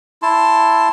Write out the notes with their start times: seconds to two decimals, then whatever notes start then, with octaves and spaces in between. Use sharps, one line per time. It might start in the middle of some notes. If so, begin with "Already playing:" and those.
0.22 E4 A5 C6